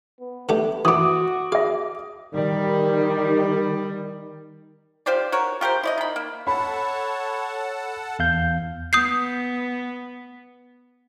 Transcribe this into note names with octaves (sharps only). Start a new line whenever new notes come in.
B3
D3 A3 B3 G4
E3 B3 F#4 D6 D#6
G#4 E5 F5
D#3 G3
F4 G4 C5 D5
F#4 A#4 C#5
F4 G4 A#4 C5
E4 D5 D#5
D#3 B5
A#3
A4 C#5 F#5 A5 B5
E2 F5 G6
B3 D#6 G6 C7